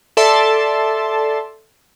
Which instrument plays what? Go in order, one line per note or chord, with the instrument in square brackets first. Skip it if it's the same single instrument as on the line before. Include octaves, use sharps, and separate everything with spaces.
[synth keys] A4 D5 E5 A5 C6